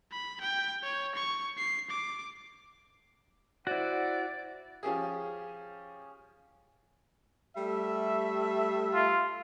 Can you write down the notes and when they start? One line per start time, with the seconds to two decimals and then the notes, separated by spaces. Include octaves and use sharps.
0.12 B5
0.41 G5
0.83 C#5
1.15 C#6
1.57 C7
1.90 D6
3.67 E4 F#4 C5 D5 F#5
4.83 F3 C#4 G4 G#4
7.56 G3 A3 E5
8.94 F4